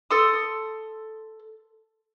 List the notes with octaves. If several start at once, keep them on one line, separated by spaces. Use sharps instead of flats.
A4 C6 D#6